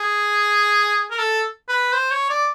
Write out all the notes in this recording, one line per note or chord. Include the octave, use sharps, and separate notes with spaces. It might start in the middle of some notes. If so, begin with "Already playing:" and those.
Already playing: G#4
A#4
A4
B4
C5
C#5
D5